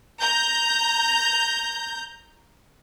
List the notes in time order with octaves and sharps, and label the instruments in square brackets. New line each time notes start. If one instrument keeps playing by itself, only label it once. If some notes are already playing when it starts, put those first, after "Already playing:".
[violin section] A#5 G6